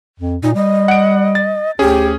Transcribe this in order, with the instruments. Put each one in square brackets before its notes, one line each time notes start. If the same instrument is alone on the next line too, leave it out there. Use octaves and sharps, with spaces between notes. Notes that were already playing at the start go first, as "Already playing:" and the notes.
[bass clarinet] F2
[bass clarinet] A#2 [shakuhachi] D#4
[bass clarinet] G3 [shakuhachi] D#5
[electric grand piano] F#5 D7
A6
[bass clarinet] D2 [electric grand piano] C#4 G#4 [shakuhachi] G4